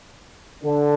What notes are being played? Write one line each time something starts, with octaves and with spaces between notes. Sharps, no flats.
D3